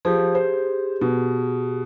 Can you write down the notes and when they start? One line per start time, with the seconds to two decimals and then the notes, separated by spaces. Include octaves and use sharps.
0.05 F3 G4 G#4
0.35 C5
1.01 B2